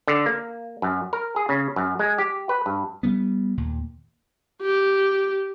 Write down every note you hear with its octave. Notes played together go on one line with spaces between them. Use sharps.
D3
A#3
F#2
A#4
G#4
C#3
F#2
G#3
G4
B4
G2
G3 A#3 B3
D#2 A#2
G4